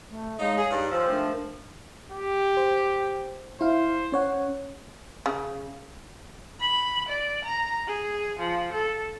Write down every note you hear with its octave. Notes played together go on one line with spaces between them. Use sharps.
A3
G#3 D#4 C#5 F5
G#4
G2 D#4
G#2 F3 C5 G5 E6
A3 D4 A#4
G4
C5
E4 C5 F5
C#4 C#5 F#5
C#3
B5
D5
A#5
G#4
F3
A4